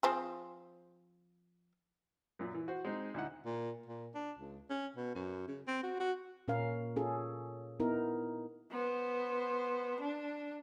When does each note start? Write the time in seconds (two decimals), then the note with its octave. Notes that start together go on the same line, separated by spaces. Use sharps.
0.03 F3 C4 G#4
2.39 F#2 A#2
2.54 E3
2.68 F#4 C5
2.85 G#3 C4 D#4
3.14 D2 D#4 E4 F#5
3.46 A#2
3.86 A#2
4.14 D4
4.38 C#2
4.70 C#4
4.96 B2
5.15 F#2
5.48 C#3
5.67 C4
5.83 F#4
6.00 F#4
6.48 A#2 C#4 A#4 F5
6.96 C#4 F4 G#4 A4
7.80 B3 D#4 E4 A#4
8.71 B3 C5
10.00 D4